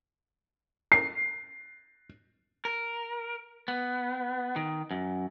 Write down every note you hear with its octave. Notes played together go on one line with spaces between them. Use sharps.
C7
A#4
B3
D#3
F#2